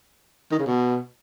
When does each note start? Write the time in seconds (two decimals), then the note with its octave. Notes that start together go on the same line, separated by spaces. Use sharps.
0.51 D#3
0.59 C#3
0.67 B2